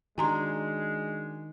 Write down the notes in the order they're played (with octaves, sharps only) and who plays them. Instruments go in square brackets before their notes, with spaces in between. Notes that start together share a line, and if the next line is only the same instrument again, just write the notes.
[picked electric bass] D#3 [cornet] G#3 [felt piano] D4 F#4 [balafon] G#5 A#5 C6